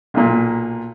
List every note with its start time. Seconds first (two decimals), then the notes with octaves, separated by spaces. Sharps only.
0.14 B1 A#2